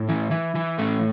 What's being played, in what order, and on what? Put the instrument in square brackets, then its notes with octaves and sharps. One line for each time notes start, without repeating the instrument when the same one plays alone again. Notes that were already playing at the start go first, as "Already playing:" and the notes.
Already playing: [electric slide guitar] A2 E4
E3
E3
E3
A2 A3